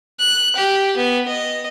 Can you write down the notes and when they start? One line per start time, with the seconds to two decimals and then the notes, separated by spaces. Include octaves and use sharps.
0.20 F#6
0.56 G4
0.97 B3
1.28 D#5